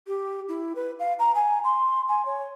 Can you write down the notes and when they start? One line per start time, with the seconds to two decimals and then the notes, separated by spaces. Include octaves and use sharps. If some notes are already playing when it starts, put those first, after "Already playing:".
0.07 G4
0.48 E4
0.76 B4
0.99 F5
1.19 A#5
1.35 G#5
1.64 C6
2.08 G#5
2.26 C#5